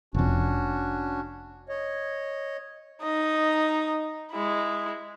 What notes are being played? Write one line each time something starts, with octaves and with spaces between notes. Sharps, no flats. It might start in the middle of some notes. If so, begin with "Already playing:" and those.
F1 F2 C#4 D4 F#4
C#5 D#5
D#4 D#5
G#3 E4